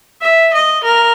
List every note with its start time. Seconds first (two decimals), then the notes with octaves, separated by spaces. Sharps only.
0.21 E5
0.53 D#5
0.83 A#4